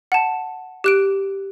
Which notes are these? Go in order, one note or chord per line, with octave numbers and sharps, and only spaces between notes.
F#5 A5
G4 F#6 D7